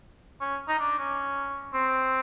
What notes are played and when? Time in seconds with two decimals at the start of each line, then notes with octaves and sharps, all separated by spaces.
0.41 C#4
0.68 D#4
0.79 D4
0.98 C#4
1.74 C4